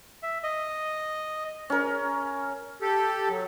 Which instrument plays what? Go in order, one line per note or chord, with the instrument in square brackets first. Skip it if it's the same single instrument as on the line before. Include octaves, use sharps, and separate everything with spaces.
[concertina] E5
D#5
[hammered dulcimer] C#4 A#4
[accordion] G4 A4
F#3